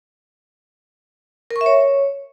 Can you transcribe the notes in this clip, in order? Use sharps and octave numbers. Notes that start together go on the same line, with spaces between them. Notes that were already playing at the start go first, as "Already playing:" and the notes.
A#4
C#6
E5
C#5